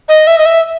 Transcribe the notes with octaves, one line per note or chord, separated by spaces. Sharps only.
D#5
E5
D#5
E5